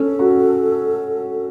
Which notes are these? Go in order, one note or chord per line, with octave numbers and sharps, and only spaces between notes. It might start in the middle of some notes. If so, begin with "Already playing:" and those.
Already playing: C#4 A4
F#4